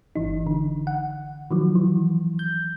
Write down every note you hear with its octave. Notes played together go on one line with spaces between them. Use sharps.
G1 E3 D#4
D3
F#5
D#3 F3 F#3
E3
G6